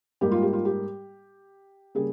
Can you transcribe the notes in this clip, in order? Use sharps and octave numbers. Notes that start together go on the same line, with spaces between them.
G#2 G3 A#3 G4
F4
G4
F4
G4
C#3 G3 A#3 G#4